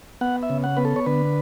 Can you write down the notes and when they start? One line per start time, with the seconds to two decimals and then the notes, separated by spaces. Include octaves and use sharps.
0.21 B3 F#5
0.43 E5
0.50 C#3
0.64 F#5
0.77 B3 B4
0.85 A4
0.96 C#5
1.06 D3 B4